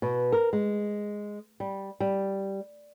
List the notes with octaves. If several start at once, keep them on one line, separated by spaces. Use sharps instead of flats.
B2
A#4
G#3
G3
G3